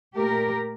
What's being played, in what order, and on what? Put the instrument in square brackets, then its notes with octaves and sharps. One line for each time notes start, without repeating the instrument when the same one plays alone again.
[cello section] A#2 A3 G4 A#4